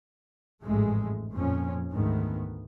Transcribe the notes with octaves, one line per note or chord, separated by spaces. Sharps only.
A1 F2 G#2 G#3 A3
F2 A#2 F3 C#4
D2 G#2 D#3 A3 B3